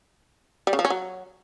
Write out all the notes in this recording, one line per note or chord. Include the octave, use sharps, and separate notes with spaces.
G3
C#3
F3
C#4
F#3